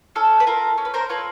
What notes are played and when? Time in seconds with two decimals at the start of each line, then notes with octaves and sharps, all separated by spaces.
0.16 C#4 A4
0.40 B4
0.47 F4 A4 A#4
0.78 C#4
0.85 B4
0.94 A#4 C5
1.09 F4 A4 B4 C#5